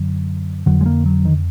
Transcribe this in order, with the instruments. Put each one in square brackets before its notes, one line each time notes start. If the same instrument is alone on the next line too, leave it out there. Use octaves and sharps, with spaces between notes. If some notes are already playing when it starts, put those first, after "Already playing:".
Already playing: [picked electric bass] F#2 D3 F#3
F2 D3 F#3
G#3
A#3
F#3
D#3